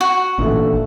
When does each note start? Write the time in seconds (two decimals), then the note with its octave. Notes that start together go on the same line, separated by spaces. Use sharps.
0.01 F#4
0.38 A1 A#2 D3 A3